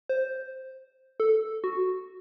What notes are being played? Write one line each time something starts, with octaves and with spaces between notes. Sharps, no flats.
C5
A4
F#4